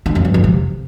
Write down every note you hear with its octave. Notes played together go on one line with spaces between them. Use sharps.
D3
F2
G2
F2
C3